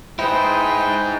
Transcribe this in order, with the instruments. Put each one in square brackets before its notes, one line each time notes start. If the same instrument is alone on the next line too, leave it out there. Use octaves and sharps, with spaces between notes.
[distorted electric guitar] D#4 G#4 [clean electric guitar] E4 [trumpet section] B4 C5 D#5 [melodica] G5